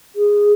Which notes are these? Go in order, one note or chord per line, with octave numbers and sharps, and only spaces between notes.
G#4